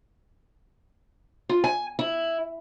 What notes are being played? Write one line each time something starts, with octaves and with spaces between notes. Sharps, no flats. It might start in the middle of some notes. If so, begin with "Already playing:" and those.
F4
G#5
E4